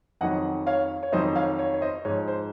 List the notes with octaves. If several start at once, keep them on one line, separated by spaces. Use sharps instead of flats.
F2 D#3 F#3 D#5 F#5
C#5 F5
C#5
F2 D#3 F#3 C5 D#5
C#5 F5
C#5
C#5
C5 D#5
G#2 F3 C#5
C5